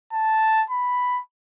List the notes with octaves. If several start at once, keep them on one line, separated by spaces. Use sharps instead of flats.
A5
B5